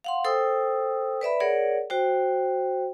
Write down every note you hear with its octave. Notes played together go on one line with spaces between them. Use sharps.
F5 F#5 C6
A4 C5 G5 D#6 E6
B4 D5 E5 B5
G#4 A#4 C#5 D5 F#5
F#4 C5 G5